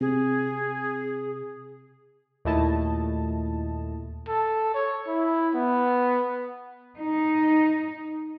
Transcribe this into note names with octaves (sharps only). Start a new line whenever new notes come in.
C3 G#4
D#2 A#2 A3 E4 D#5 A5
A4
C#5
E4
B3
D#4